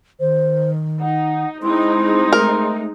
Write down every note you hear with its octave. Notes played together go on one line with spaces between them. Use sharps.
D#3 C5
D#4 F#5
G#3 C4 D#4 E4 C6
A3 A#4